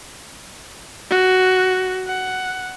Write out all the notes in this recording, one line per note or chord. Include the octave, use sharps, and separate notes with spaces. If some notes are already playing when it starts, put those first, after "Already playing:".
F#4
F#5